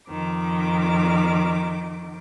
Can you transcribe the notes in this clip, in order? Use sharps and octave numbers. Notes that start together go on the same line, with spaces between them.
F2 D#3 D6